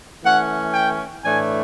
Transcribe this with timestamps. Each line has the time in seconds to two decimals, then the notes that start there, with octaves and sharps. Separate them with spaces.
0.23 E3 A3 C#4 F#5
0.74 G5
1.24 A2 E3 A3 D4 G#5